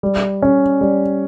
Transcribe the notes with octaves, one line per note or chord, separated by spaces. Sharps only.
G3
C#4
G3